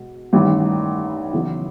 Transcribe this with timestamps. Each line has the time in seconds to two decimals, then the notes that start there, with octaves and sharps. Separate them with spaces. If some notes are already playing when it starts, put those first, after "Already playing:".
Already playing: B2 G#3
0.33 A1 G2 D#3 G3 B3
1.33 E2 C#3 F#3 B3 E4